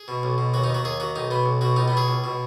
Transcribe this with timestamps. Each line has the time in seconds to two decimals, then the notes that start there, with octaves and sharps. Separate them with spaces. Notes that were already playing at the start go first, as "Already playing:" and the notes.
Already playing: G#4
0.08 B2
0.23 B1
0.38 B2
0.54 D#2 F#4
0.64 D#4
0.69 D#3
0.74 F#4
0.84 D#2 G#4
1.00 D#3 F#4
1.16 B1 D#4
1.31 B2 B3
1.46 B1
1.61 B2 F#4
1.76 C#2 D#4
1.88 B3
1.92 B2
1.97 G#4
2.08 C#2
2.24 B2